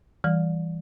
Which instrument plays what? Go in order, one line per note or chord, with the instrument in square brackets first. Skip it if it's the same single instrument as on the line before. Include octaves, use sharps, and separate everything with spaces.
[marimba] E3 G3